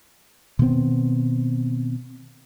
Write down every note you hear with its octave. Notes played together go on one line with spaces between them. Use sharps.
B2 D#3 B3 C4